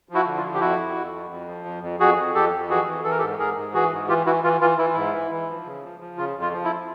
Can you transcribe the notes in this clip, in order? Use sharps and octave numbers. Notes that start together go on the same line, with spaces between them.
F3
E4 F#4
D3
F4
F3
G4
F2 E4 F#4
F2
F2
F2
F2
F3
F2
F2
F2 F#4 G#4
F2
F2 G4 A4
F2
E3 F#4 G#4
E3
E3 A4
A#4
G4 A4
G#2
G#2 G#4 A#4
G#2
E3 F#4 G#4
G#2
E3 F4 G4
E3 E4 F#4
E3 F4
E3 F4
E3 E4
G#2 E4
E3
E3
F3
C#3
F3
F3
C#3 F4
F2
F4
F3
E4